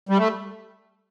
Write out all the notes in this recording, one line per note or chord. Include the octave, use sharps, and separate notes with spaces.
G3
A3